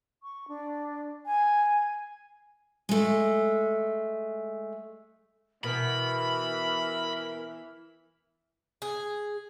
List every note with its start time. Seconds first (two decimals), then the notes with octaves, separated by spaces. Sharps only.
0.22 C#6
0.48 D4
1.26 G#5
2.89 G#3 A3
5.64 B2 E3 A#4 B5
8.82 G#4